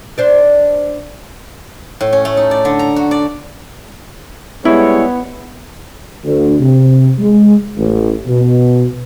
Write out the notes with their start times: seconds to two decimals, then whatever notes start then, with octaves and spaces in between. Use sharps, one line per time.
0.18 D4 C5 D5
2.01 A2
2.13 C#4
2.25 A3
2.37 D#4
2.51 D5
2.65 D3
2.79 A#5
2.96 F#4
3.11 D5
4.65 G3 G#3 B3 E4 C#5
6.24 D2
6.60 C3
7.19 G#3
7.77 A1
8.27 B2